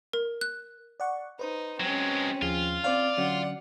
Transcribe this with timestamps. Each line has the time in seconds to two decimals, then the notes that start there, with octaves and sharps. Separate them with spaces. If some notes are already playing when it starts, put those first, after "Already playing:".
0.13 A#4
0.41 F#6
1.00 D5 F#5 C#6
1.39 D#4 B4 C5
1.80 F#3 G#3 C4 C#4
2.42 D#2 F3 F4 G#4
2.84 C4 C5 D5 F5
3.18 D3 F#3 C#4 F#5